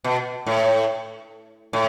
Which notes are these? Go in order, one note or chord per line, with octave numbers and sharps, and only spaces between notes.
B2
A2
A2